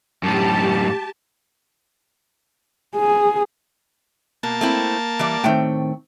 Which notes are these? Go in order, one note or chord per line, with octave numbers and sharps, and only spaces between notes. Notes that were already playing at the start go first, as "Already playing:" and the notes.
F#2 A2 G4 A5
G#4
B2 A#3 A5
A3 C4 E4
E3 G3 D5
A2 D#3 A3 C4 G5